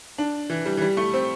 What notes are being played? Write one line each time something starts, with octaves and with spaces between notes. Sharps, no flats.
D4
E3
G3
E3
G3
A3
C4